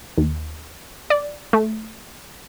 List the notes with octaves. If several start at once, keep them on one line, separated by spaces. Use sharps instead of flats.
D#2
D5
A3